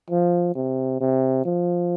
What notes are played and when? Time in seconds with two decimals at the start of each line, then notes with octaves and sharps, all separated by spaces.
0.10 F3
0.55 C3
1.00 C3
1.45 F3